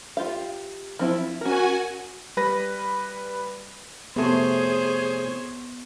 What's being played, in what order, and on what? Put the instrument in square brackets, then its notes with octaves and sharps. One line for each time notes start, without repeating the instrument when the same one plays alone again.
[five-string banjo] F4 G4 F5
F3 C4 E4
[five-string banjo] C#4 A#4 [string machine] F#4 G#5
[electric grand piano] G3 B4 A#6
[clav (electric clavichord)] F2 C3 A3 [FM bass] B3 [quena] G#4 [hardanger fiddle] C5 C#5